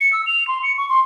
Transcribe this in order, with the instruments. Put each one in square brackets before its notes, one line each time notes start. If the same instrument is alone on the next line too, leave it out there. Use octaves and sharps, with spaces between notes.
[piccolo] C#7
E6
F7
C6
C#7
C#6
C6